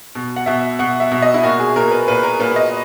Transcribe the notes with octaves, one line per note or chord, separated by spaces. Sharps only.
B2
F#5
B2 E5
B2 F#5
E5
B2
D#5
E4
A#2 F#4
G#4
A#2 A#4
B4
A#2 B4
A#4
A#2 B4
D#5